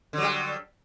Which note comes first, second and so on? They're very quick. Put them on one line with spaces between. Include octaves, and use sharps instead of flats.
D3 F#3 G3